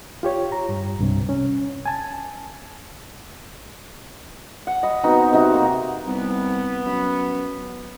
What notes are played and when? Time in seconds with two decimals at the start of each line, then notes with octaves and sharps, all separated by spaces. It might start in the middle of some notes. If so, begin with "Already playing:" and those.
0.23 F4 G4 C#5
0.52 A#5
0.69 G2
0.99 C2 G2 C3
1.29 C#4
1.86 G#5 A5
4.67 F#5
4.83 D#5 B5
5.04 B3 C4 D#4 F#4
5.33 C3 D#4 F#4
5.54 A#3
6.06 C2 B3
6.86 F#2